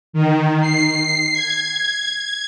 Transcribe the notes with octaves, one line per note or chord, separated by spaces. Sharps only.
D#3
C7
G#6